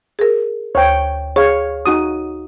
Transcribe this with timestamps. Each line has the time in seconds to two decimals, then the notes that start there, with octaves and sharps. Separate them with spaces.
0.19 G#4 A#4
0.75 D2 C5 C#5 G5
1.36 G#4 C#5 F5
1.86 D#4 F#4 D#6